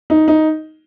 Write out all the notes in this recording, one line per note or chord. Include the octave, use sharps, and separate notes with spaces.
D#4
D#4